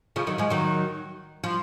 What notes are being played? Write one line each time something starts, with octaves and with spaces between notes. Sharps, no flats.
C#3 F3
D#3 F#3
F3 G#3
D#3 F#3
F3